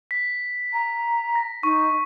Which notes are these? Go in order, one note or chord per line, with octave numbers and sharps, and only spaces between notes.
B6
A#5
A#6
D#4 C#6